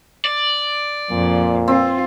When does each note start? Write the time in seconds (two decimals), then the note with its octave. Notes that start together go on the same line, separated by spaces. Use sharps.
0.25 D5
1.11 F2 A#2
1.68 C4 F4